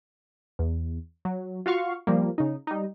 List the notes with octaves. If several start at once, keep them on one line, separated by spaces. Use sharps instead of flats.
E2
F#3
F4 F#4 F5 C#6
F3 G3 A#3
C#3 D#4
G3 D#4